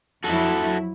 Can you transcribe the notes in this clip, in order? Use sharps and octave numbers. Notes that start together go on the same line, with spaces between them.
F2 F#3 E4 F#4 A4